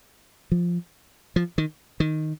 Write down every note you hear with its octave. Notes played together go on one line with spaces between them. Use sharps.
F3
F3
D#3
D#3